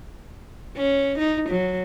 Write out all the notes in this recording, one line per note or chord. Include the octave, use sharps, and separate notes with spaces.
C#4
D#4
F#3